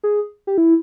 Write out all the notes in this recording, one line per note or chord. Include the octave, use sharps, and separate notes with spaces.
G#4
G4
E4